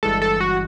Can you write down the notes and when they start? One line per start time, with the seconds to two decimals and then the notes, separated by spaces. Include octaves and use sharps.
0.03 G1 G2 E3 G#3 A4
0.22 A4
0.40 F#4